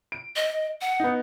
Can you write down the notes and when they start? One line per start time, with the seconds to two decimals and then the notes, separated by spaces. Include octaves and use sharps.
0.12 D7
0.36 D#5
0.81 F#5
1.00 B3 D#4